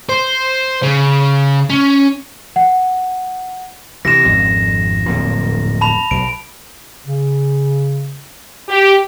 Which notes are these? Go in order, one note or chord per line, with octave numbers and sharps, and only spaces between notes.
C5
C#3
C#4
F#5
C3 E3 A#6 E7
G#1 F2
D1 F2 A#2
A5 B5 F7
B1 D7
C#3
G4